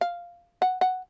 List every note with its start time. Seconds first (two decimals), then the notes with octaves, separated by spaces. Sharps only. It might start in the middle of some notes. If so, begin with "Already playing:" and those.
0.01 F5
0.62 F#5
0.81 F#5